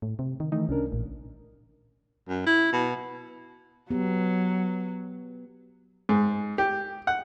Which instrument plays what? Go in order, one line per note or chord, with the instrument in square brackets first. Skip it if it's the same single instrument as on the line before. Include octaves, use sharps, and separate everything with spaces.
[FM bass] A2
C3
D#3
[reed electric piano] D#3 E3 A3 [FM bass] D#4
[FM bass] C2 [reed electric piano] C#4 D4 A#4
[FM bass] A1 [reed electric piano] A#2
[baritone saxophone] F#2
E4
B2
[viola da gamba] F#3 [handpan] B3 G4
[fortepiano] G#2
G4
F#5